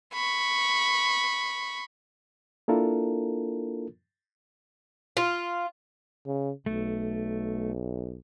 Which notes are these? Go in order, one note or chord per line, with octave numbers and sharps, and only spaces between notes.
B5 C#6
A#3 D4 E4 F4 A4 A#4
F4
C#3
B1 A3